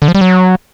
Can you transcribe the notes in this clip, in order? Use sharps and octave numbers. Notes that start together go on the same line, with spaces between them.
D3
F3
G3
F#3